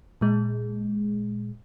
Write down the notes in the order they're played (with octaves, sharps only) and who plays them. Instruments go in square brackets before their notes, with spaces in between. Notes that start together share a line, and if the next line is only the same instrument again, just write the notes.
[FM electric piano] A#2 G#3